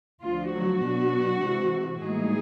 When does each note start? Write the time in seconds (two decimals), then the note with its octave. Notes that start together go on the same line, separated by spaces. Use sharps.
0.24 D2 D3 F3 F4
0.54 F#3 F#4
0.85 B2 F#3 B3 D4
1.43 C3 E3 G#3
2.02 A2 E3 G3 G#3 A#3 D#4 G#4